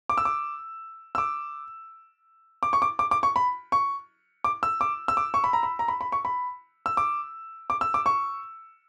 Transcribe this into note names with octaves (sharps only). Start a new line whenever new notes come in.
D6
E6
D6
E6
D6
D6
C#6
D6
D6
D6
C#6
B5
C#6
D6
E6
D6
E6
D6
C#6
B5
A#5
B5
A#5
B5
B5
C#6
B5
E6
D6
D6
E6
D6
C#6